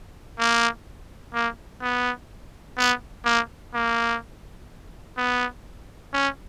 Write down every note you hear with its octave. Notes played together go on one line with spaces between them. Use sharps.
A#3
A#3
B3
B3
A#3
A#3
B3
C#4